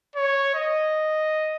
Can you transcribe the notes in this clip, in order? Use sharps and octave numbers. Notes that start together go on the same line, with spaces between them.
C#5
D#5